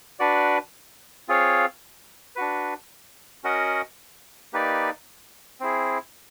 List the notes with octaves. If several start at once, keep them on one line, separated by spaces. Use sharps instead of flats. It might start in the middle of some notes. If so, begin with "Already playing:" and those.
D4 F#4 B4 D5
C4 F4 G#4 C#5 F5
D4 F#4 B4
C#4 F#4 A#4 D#5 F#5
A#3 D#4 G4 B4 D5
C4 E4 G#4